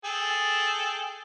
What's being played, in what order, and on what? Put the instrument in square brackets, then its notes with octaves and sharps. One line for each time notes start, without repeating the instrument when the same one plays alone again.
[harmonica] G#4 A4 G5